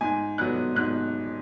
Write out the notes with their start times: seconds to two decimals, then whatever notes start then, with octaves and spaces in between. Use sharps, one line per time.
0.01 G#2 G#5
0.38 F#3 B3 F#6
0.76 G#2 F#6